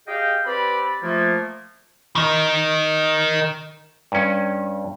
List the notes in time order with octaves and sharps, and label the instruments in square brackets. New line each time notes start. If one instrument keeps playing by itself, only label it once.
[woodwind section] G4 G#4 D#5 F5 G5
C4 G4 B4 D5 B5
F3 A3 A#3
[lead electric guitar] D#3 D#4
[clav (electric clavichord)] G2 C#4